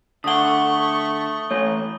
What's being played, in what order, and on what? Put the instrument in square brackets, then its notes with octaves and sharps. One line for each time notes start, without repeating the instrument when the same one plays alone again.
[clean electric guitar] D3 F#5 [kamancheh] A3 C#6 [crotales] D#6 G7
[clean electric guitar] E3 A3 [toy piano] C#5